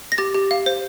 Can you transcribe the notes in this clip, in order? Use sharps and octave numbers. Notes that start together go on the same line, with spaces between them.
A#6
G4 A6
G4
F5
C5